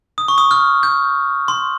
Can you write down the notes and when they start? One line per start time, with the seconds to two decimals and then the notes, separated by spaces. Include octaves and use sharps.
0.18 D#6
0.28 C#6
0.38 D#6
0.51 F6
0.83 G6
1.48 C6